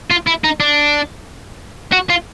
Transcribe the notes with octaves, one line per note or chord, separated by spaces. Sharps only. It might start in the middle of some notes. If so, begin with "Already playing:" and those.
F4
E4
D#4
D4
F#4
F4